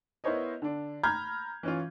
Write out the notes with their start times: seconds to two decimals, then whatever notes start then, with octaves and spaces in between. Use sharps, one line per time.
0.24 B3 E4 A#4 C5 C#5 D#5
0.62 D3 D4
1.04 A#5 B5 F6 G6 G#6
1.63 E3 C#4 F4